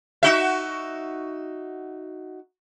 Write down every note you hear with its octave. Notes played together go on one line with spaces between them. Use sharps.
D#4 F#4 E5